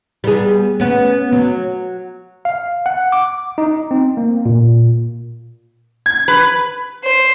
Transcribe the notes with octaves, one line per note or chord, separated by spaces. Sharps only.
G3 B3 G#4
B3 C#4
F#3
F5
F#5
D6
D#4
C4
A#3
A#2
G#6
B4
C5